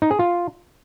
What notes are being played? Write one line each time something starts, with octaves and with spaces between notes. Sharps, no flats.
D#4
G#4
F4